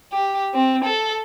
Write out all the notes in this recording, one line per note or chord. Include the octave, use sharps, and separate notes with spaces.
G4
C4
A4